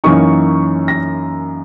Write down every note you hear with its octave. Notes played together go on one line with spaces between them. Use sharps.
F#2 E3 A#3 D#4 C#6
A#6